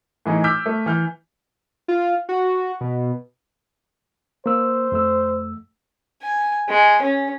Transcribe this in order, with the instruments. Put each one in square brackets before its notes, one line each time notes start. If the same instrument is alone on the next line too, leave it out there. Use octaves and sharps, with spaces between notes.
[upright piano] A2 E3 D#4 G#4
D6 E6 F6 G6 B6
A3
E3 F6 G6
[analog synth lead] F4
F#4
B2
[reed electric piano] A#3 E6 [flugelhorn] C5
[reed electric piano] F2 A3 E6
[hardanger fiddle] G#5
G#3
C#4